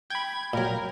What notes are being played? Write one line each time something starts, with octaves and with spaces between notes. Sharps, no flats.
G5 B5 G#6
A#2 F#3 A#4